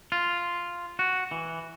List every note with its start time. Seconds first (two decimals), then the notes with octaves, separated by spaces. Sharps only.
0.12 F4
0.99 F#4
1.31 E3